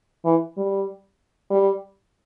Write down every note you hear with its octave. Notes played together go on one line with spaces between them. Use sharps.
E3
G3
G3